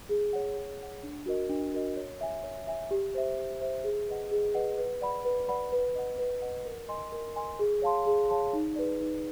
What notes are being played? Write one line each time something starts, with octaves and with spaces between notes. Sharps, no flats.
G#4
C#5 F#5
G#4
C#5 F#5
D4
F#4 A#4 D#5
D4
F#4 A#4 D#5
C#5
E5 G#5
C#5
E5 G#5
G4
C5 E5
G4
C5 E5
G#4
B4 D#5 F#5
G#4
B4 D#5 F#5
B4
D5 F#5 B5
B4
D5 F#5 B5
B4
D#5 F#5
B4
D#5 F#5
A#4
D#5 G#5 C6
A#4
D#5 G#5 C6
G#4
C#5 F5 A5 C6
G#4
C#5 F5 A5 C6
D#4
G#4 B4 D5
D#4